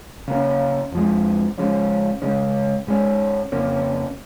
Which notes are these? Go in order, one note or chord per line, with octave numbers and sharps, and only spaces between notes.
C#3 A#3 C#4
F2 F3 G#3
C#3 F3 G#3 C#4
C#3 G#3 C#4
G#2 G#3 C#4
F2 C#3 A#3 C#4